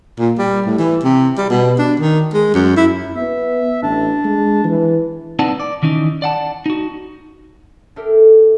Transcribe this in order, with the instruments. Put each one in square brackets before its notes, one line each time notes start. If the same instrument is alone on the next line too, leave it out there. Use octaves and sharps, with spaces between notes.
[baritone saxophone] A#2
G3
A2
E3
C3
G3
B2
D4
D#3
G#3
F#2
E4
[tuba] B3 [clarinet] E5
[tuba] A1 [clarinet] D4
[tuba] G#3
E3
[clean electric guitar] C4 D#4 B4 D5 F#5 A5
D5
D#3 E3 C#4 D#4
D5 F#5 A5
D#4 F#4
[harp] D4 G4 A4 A#4 E5